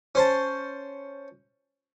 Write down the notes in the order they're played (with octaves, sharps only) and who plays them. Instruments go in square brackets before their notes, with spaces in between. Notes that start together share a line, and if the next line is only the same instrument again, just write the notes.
[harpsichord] C#4 C5 A5